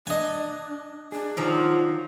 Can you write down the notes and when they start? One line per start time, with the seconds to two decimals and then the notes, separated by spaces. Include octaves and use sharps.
0.07 D4 D#5 G#5
1.12 D4 G#4
1.37 D#3 F3 F#3